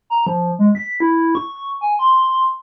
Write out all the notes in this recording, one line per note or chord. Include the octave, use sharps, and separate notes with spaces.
A#5
F3
G#3
B6
E4
C#6
G#5
C6